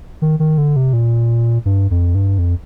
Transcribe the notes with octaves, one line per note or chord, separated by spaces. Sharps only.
D#3
D#3
D3
C3
A#2
G2
F2
G2
F2